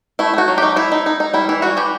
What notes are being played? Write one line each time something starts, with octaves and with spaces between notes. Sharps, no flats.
A3 E4
A3 F#4
F#3
D#4 G4
D#4 E4
D#4
D#4
D#4
G3 E4
E3 E4
G3 F#4
E3 G4